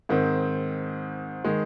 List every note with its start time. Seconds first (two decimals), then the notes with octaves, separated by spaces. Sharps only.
0.09 G#2 D#3 C4
1.44 D#3 G#3